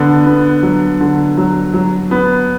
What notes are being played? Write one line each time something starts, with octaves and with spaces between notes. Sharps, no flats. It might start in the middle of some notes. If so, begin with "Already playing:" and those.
Already playing: D3 B3
B3
F#3
D3
F#3
F#3
B3